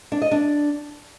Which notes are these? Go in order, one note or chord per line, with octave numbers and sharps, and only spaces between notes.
D4
D#5
D4